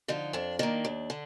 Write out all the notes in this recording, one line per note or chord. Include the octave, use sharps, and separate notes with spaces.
D3 F3 D#4
F2 D4
D#3 A#3 D4
D#2
D3